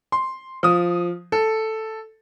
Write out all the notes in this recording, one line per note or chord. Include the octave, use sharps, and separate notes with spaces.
C6
F3 D#6
A4